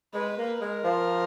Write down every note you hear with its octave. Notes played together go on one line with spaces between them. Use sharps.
G#3 B4
A#3
G#3 A#4
F3